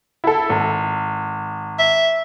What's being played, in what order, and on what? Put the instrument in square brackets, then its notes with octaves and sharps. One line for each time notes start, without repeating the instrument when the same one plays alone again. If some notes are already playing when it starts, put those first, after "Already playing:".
[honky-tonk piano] E4 A4
G#1
[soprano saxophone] E5